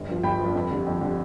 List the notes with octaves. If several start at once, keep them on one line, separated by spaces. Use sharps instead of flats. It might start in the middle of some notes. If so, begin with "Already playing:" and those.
Already playing: G1
G2 F3
G1 G5 B5
F3
G2
F2
D3 G3
F2
D3 G3